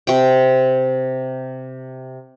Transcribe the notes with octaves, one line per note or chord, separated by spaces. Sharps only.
C3 G5